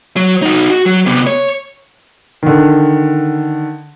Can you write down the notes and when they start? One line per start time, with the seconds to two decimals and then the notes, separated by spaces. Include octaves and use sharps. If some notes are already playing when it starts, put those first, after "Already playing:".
0.16 F#3
0.42 D#4 F#4
0.70 F#4
0.86 F#3
1.06 C3 B3
1.27 C#5
2.43 D3 D#3